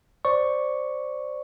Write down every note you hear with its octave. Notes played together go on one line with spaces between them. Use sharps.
C5 D5 C#6